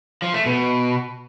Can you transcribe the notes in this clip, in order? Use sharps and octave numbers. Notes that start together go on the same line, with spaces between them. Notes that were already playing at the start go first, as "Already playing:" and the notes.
F3
A3
B2